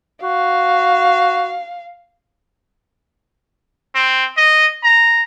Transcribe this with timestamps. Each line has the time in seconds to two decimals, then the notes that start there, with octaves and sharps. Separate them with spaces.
0.23 F#4 F5
3.95 C4
4.37 D#5
4.84 A#5